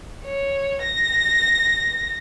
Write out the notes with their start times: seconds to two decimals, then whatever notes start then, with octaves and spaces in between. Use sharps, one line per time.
0.24 C#5
0.83 A#6